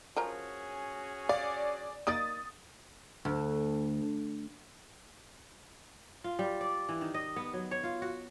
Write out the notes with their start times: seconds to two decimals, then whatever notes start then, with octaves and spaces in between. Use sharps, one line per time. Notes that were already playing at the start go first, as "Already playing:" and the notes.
0.16 F3 C#4 F#4 G#4 A#4 A#5
1.29 D5 F5
2.07 A#3 D#4 D5 D#6 A6
3.25 D2
6.24 F4
6.39 G3
6.61 D5
6.89 E3
7.01 D#3
7.14 D#5
7.36 B3
7.53 F#3
7.71 C#5
7.83 F4
8.02 F#4